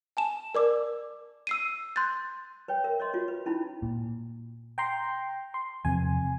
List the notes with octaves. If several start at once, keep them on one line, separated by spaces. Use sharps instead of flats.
G#5 A5 E7
A#4 D5 D6 E6
E6 C7 D#7
C6 F#6 G6 A6
B4 C#5 G5
A#4 E5
C#5 D#5 C6
F4 F#4 C#5
B4
C#4 D#4 E4 B5
A#2
G5 A#5 C6
C6
E2 C3 F3 G#5